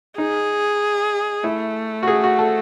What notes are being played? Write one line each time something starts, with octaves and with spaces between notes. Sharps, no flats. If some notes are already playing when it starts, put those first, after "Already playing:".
D#4 G#4
A3 E4
F#4
G#4
F#4
A4